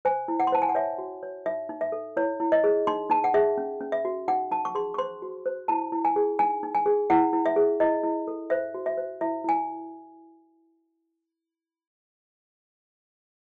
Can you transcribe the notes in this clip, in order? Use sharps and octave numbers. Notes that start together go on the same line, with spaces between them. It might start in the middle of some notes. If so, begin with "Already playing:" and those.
C5 G#5
E4
F#5
C6
C5 A5
G#5
F#5
C#5 E5
F#4
C#5
D#4 E5
D#4
E5
A4
E4 C#5
E4
D#5
G#4
D#4 C6
D#4 A5
F#5
G#4 E5
C#4
C#4
E5
F#4
D#4 F#5
D#4 A5
C#6
G#4 C6
C#6
C5 C6
F#4
C5
E4 A5
E4
G#5
G#4
D#4 G#5
D#4
G#5
G#4
E4 F#5
E4
E5
G#4
E4 D#5
E4
A4
C5 E5
F#4
E5
C5
E4 E5
E4 G#5